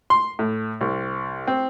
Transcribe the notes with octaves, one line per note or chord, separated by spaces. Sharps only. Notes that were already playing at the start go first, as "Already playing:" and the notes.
C6
A2
C2
C4